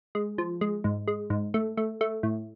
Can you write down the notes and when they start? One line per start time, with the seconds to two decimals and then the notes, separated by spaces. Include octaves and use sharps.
0.15 G#3
0.38 F3
0.61 G#3
0.84 G#2
1.08 G#3
1.30 G#2
1.54 A3
1.77 A3
2.01 A3
2.23 A2